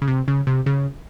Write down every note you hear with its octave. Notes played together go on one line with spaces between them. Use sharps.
C#3
C3
C#3
C3
C#3